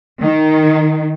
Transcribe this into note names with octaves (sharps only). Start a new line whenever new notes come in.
D#3